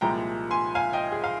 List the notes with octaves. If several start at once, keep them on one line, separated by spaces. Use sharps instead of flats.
C2 A#2 F3 G#3 G5 A#5
G#5 C6
F5 G#5
D#5 G5
G#4
F5